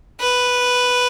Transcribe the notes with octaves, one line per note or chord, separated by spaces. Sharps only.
B4